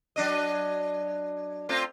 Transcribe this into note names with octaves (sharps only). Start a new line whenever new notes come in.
F#3 D4 D#5
A3 C4 F4